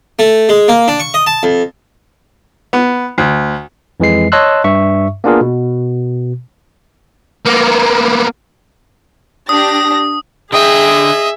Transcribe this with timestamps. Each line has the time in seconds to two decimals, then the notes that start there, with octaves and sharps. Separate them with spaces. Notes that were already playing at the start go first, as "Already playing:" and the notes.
0.19 A3
0.49 G#3
0.68 A#3
0.88 D4
1.00 C#6
1.14 D#5
1.26 A5
1.43 F2
2.73 B3
3.18 D2
4.00 F2 E3 G#3 C7
4.32 C#5 D#5 A5 C6 E6 F#6
4.64 G2 E5 C#6
5.24 A#3 B3 D4 F4 G#4 A#4
5.41 B2
7.45 A#3 B3
9.49 D4 G4 D#6 A#6
10.52 D3 G#4 D#5 E5 G5